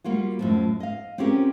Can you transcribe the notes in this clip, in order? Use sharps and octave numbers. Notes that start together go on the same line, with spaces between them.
G3 A#3 F4 F#4
F#2 A2 F3
D#5 F5
C4 C#4 F4 G4 G#4 A#4